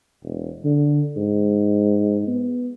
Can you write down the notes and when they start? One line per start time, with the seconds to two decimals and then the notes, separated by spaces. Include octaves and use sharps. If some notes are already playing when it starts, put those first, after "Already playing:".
0.24 E1
0.65 D3
1.17 G#2
2.27 B3